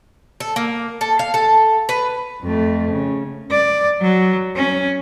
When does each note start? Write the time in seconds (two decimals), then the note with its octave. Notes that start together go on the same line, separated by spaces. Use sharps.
0.40 A4
0.56 A#3
1.01 A4
1.19 F5
1.34 A4
1.89 B4
2.42 F2 A3
2.91 C#3
3.50 D5
4.01 F#3
4.56 C#4